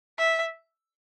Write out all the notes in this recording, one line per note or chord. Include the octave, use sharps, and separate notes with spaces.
E5